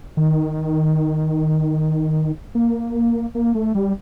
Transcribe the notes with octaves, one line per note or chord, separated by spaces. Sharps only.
D#3
A#3
A#3
A3
G3